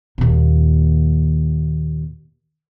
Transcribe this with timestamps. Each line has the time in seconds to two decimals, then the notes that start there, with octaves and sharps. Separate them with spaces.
0.18 D#2 A#2